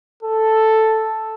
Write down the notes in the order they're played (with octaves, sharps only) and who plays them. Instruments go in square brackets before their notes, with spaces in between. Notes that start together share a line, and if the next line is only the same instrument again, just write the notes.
[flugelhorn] A4